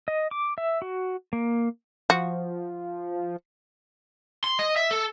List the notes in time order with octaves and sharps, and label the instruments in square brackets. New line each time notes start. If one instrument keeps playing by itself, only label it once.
[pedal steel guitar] D#5
D6
E5
F#4
A#3
[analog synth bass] F3 [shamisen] F#4
[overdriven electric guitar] C6
D#5
E5
A4